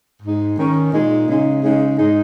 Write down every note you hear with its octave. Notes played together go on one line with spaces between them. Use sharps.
G#2 G#3 D#4
D#3 C#4
A#2 G#3 D#4
C#3 G#3 D#4
C#3 G#3 D#4
G#2 G#3 D#4